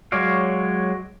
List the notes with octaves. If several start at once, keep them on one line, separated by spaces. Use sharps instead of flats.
F#3 G#3 C#5 D5 F5